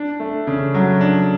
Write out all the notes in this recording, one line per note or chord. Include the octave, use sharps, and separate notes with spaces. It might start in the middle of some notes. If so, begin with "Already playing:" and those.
Already playing: D4
A3
C#3
F#3
D4